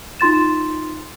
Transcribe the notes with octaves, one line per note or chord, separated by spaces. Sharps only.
D#4 F4 C6 A6 E7